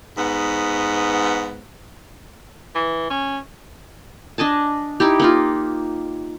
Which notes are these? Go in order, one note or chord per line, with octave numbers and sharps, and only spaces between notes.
G#2 B3
E3
C#4
D4 D#5 G#5 A5
D#4 E4 G4
A#3 D#4 F4